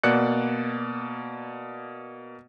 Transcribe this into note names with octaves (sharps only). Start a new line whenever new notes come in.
B2 A#3 D5 F#6 C#7